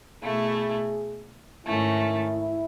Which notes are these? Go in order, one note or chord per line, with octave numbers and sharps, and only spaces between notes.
B2 A3 E4 G#4
G#2 D#3 A3 C#4 E4